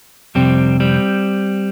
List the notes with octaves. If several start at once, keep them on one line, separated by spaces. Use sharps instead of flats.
F2 C3 G3 C4
G3 C4